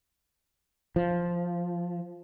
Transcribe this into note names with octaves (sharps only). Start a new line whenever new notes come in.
F3